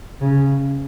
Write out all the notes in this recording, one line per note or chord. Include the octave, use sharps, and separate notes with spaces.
C#3